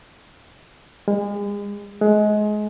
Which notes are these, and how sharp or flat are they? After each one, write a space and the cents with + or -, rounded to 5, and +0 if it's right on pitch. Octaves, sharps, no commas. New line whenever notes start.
G#3 -35
G#3 +25